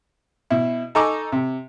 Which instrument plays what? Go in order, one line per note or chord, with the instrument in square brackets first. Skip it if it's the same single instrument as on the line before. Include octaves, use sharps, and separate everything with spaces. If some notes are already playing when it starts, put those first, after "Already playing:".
[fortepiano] B2 E4
D#4 A4 G#5 A#5 C#6 D6
C3